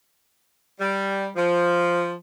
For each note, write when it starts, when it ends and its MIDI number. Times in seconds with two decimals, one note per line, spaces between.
0.80 1.28 55
1.36 2.11 53